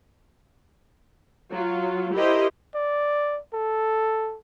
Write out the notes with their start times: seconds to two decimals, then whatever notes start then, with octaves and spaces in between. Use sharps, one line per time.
1.52 F#3 F4
2.15 E4 G4 A#4 C5 D#5
2.75 D5
3.54 A4